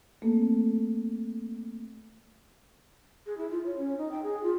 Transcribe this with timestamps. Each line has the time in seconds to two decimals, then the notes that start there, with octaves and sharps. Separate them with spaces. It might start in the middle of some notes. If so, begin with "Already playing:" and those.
0.22 A3 A#3 C4 A4
3.26 G#4
3.37 E4
3.50 F4
3.66 C#5
3.77 C#4
3.98 D#4
4.11 G5
4.23 G#4
4.43 F4